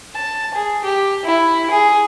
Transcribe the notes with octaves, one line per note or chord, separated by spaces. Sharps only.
A5
G#4
G4
E4
G#4